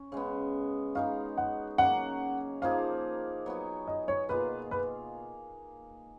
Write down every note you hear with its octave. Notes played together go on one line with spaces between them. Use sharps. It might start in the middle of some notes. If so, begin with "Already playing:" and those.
Already playing: C#4
C#3 G#3 B3
G#3 D#4 F#4 F5
F#5
C#3 F#3 A#3 F#5
F3 A#3 D#4 G#4 F5
F#3 B3 F#4
D#5
C#5
B2 A#3 F4 G#4 B4
B4